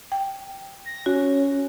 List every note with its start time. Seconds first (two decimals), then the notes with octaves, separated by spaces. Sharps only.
0.12 G5
0.85 A#6
1.06 C#4 F#4